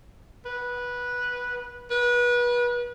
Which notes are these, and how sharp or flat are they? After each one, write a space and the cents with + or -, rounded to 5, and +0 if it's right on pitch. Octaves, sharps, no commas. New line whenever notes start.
B4 -10
B4 -30